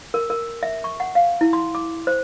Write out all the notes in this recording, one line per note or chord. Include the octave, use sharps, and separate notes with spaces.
A#4
A#4
E5
C#6
F#5
F5
E4
C6
D6
C5